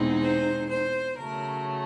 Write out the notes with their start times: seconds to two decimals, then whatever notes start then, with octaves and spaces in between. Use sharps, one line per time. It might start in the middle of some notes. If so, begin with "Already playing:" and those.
Already playing: E2 B2 G#3 C4 D#4
0.21 C5
0.69 C5
1.17 C#3 F#3 A3 A#4